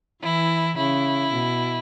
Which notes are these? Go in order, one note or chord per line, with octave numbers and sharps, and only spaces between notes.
E3 E4
C#3 E4
B2